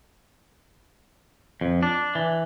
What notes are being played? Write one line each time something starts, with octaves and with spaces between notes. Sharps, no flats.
F2
D4
E3